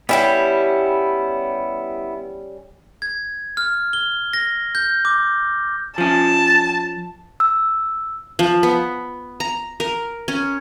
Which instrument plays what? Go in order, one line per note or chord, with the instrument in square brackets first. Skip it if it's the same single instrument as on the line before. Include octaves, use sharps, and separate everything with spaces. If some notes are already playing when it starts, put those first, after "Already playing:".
[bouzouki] G3 C#4 G4 [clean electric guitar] B3 E4
[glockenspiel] G#6
F6
G7
A#6
G6
D6
[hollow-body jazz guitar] F3 C#4 [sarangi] A5
[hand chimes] E6
[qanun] F3
B3
A#5
A#4
C#4